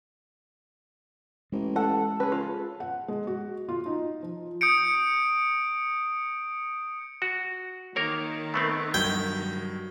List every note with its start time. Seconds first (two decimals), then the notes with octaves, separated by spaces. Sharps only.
1.52 A1 G#3
1.76 A4 F#5
2.20 C#3 G#4 B4
2.32 F4
2.80 F#5
3.08 G#3
3.27 F#4
3.69 F4
3.86 D#4
4.23 F3
4.61 D#6 G6 C#7 D7
7.22 F#4
7.96 D#3 A#3 A#4 C#5
8.54 A3 B3 C4 B5 C#6
8.94 G2 F#3 G5 G#6